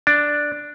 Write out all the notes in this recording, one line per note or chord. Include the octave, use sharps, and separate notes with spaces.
D4